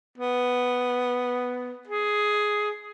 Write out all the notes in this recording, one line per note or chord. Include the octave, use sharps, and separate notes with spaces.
B3
G#4